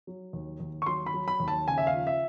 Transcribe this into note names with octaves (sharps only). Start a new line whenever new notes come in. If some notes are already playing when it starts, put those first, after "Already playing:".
F#3
D#2
D#2
C#6
F#3 C6
B5
F#3
B5
D#2
A5
C#3 G#5
E5
F5
F3
E5